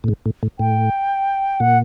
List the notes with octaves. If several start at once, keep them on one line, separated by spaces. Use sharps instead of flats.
A2
G#2
A2
A2
A2 G5
A#2 F#5